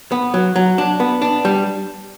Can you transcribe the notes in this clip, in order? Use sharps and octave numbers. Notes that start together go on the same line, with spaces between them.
B3
F#3
F#3
D4
B3
D4
G3